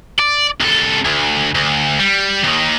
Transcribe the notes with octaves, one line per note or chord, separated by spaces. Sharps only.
D5
C2 A4
D2
D2
G3
D#2 D#3